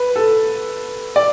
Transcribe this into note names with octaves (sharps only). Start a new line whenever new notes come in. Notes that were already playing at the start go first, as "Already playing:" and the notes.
Already playing: B4
A4
D5